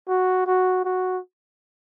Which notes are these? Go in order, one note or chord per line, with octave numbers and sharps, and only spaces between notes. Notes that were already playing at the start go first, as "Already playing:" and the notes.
F#4
F#4
F#4